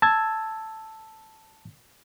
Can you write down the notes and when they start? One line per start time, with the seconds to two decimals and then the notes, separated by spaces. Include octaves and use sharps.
0.02 A5 E6 G#6